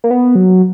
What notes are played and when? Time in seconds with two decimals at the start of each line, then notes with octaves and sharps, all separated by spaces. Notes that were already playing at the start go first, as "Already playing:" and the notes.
0.04 A#3
0.11 B3
0.35 F#3